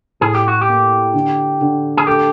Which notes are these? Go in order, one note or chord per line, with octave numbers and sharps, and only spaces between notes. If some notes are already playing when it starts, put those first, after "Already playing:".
A2 G#4
G4
F#4
G4
A#3
D3
D3
G#4
A3 G4